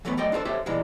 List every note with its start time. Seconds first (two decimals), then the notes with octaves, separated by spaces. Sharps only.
0.05 E3 F#3 A3 B3 A#4 B4
0.17 F#3 A3 D5 D#5 G5
0.32 D4 F4 G4 A4 C5
0.45 G4 A4 C5 C#5 E5
0.66 A#2 E3 G3 G#3 D#4